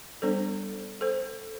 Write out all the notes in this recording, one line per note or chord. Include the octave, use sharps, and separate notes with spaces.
G3 B3 D4 A4 C5
A4 C5